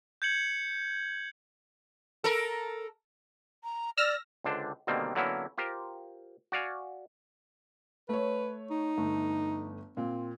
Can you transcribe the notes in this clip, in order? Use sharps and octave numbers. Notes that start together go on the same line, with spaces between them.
G6 G#6 C#7 F#7
A4 A#4
A#5
D5 E6 F6 A#6
C#2 D3 D4 C5
B2 D3 D#3 G3 A#3 C4
D3 F#3 A#3 B3 C#4 E4
F4 G4 A#4 C5
F#4 D5 F5 G#5
A3 B4 C#5
D#4
G1 A3
A#2 C4